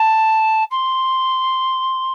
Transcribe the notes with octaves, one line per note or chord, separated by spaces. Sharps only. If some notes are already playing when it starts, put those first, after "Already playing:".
Already playing: A5
C6